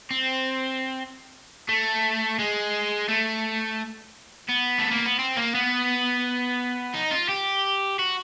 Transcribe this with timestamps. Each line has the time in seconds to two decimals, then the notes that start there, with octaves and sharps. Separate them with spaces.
0.11 C4
1.69 A3
2.39 G#3
3.09 A3
4.49 B3
4.79 A3
4.91 A#3
5.06 B3
5.19 C4
5.37 A#3
5.55 B3
6.94 D#4
7.11 F4
7.29 G4
7.99 F#4